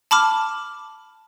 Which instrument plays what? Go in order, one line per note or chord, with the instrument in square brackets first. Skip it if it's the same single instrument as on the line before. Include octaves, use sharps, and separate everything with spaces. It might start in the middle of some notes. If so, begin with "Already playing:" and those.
[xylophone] A5 B5 D6 F6